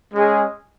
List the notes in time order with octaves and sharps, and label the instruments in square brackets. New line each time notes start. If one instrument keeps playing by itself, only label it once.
[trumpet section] G#3 C#4 G#4 D#5